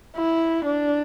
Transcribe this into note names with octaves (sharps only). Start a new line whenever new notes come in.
E4
D4